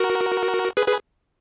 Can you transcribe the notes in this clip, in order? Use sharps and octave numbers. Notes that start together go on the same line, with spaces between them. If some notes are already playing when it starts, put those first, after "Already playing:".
Already playing: F#4 A#4
G#4 B4
G#4 B4